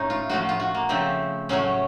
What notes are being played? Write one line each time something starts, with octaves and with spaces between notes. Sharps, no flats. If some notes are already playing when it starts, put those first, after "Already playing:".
Already playing: A2 A3 C#4 D#4
F4
A2 F3 A3 F#4
F4
F#4
A#3
C#3 F3 A3 C4
A2 F#3 A3 C#4